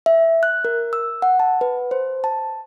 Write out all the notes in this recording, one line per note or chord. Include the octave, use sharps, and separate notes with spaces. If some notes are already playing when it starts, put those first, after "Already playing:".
E5
F#6
A#4
E6
F#5
A5
B4
C5
A5